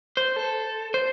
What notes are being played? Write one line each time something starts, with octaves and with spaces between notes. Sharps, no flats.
C5
A4
C5